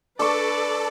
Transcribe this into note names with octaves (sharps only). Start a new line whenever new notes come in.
D4 A4 B4 D5 C#6